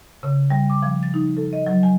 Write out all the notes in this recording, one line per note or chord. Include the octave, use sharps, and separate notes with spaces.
C#3
G3
D6
F3
A6
D#4
A4
D#5
F#3
G#5